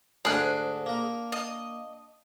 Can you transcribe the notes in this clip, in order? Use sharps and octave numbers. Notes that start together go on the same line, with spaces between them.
D2 G#2 D4 G#4 F#6
A#3 A#4
D#5